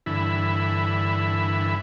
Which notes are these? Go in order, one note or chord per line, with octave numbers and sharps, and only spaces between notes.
G2 D3 E3 E4 B5 E6